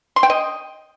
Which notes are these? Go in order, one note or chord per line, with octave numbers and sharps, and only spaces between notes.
C6
G5
D#5